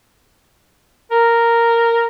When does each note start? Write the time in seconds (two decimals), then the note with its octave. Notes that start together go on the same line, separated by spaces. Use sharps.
1.11 A#4